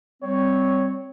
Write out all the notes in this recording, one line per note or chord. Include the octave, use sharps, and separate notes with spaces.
G3 C4 C#5